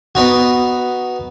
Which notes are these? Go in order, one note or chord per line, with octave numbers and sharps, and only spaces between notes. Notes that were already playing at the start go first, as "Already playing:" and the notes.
B3 D#4 F#4